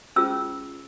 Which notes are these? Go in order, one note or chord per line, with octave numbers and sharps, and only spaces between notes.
C#4 F4 G#4 C5 E6